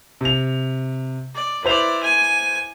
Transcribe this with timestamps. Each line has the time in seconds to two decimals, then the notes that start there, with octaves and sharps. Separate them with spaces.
0.21 C3 F7
1.35 D5
1.64 E4 B4 C5 D5 F7
2.03 G#5